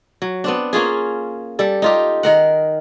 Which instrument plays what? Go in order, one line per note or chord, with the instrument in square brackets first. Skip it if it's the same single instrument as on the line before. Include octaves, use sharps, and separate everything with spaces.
[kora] F#3
B3 C4 D4
A#3 C#4 F4 G#4
G3 A4
D#4 F4 G4
D#3 A#4 F#5